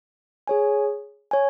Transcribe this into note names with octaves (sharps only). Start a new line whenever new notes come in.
G#4 C#5 G#5
C#5 G#5